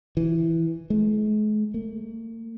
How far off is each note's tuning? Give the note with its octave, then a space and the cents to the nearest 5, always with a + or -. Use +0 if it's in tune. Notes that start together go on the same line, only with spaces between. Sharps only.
E3 +0
G#3 +45
A#3 -45